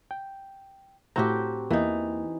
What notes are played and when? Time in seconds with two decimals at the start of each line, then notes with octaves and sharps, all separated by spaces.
0.11 G5
1.16 A2 C4 F#4 G4 A5 A#5
1.71 E2 E3 A#3 D#4